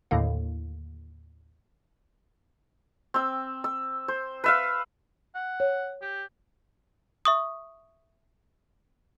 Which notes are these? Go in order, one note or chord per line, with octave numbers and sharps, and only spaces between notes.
D#2 A2 D3 A#3
C4 E6
E6
C5
B4 E5 F5
F#5
C#5
G4
E5 C#6 D#6